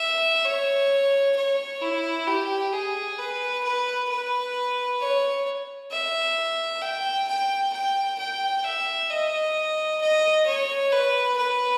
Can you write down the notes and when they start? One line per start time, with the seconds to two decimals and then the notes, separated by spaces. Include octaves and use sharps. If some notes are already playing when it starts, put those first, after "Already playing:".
Already playing: E5
0.45 C#5
1.36 C#5
1.82 E4
2.27 G4
2.73 G#4
3.18 B4
3.64 B4
4.09 B4
5.00 C#5
5.91 E5
6.82 G5
7.28 G5
7.73 G5
8.18 G5
8.64 E5
9.10 D#5
10.01 D#5
10.46 C#5
10.92 B4
11.37 B4